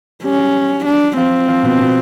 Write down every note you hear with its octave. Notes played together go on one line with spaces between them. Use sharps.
G3 C#4 G4
F#3 F#4
D4
F3 C4 F4
F3 F4
B2 B3
B2 B3